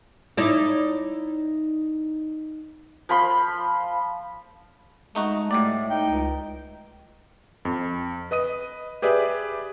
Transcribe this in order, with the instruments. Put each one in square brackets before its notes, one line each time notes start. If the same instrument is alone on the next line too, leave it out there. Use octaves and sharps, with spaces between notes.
[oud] D#4 E4 D5
[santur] F3 B5 C6
[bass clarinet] G#3 [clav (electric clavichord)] A3 D#4 F#4
[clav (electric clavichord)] A2 G4 D5 [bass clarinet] A3
[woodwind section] D#4 G5
[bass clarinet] C#2
[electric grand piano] F2
B4 D#5 D#6 D#7
G4 G#4 B4 D5 E5